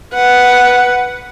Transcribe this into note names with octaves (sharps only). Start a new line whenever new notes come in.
B4 F#5